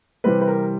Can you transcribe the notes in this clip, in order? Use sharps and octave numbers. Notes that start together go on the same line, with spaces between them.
C3 E3 G3 C4 B4
B4
A#4